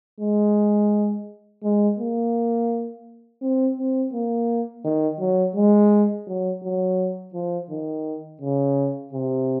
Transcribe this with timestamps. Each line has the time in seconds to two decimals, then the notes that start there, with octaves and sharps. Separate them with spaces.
0.20 G#3
1.63 G#3
1.99 A#3
3.42 C4
3.77 C4
4.13 A#3
4.84 D#3
5.20 F#3
5.55 G#3
6.27 F#3
6.63 F#3
7.34 F3
7.70 D#3
8.41 C#3
9.13 C3